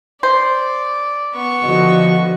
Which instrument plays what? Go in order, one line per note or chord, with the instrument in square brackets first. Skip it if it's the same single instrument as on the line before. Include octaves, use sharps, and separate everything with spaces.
[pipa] C5 [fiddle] D5
[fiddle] B3 C#6
[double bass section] D3 F3 [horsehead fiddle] F#4 D#5